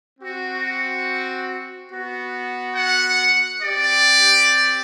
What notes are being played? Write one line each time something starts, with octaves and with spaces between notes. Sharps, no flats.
C4 F#4
B3 F#4
F#5
C4 G4 D5